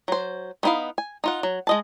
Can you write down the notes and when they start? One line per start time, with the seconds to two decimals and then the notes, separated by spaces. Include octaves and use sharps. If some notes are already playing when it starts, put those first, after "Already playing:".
0.08 F#3 C5
0.63 A3 B3 D#4 E4 F5
0.98 G#5
1.24 D#4 F4 F#5
1.43 F#3
1.67 G#3 D#5 A5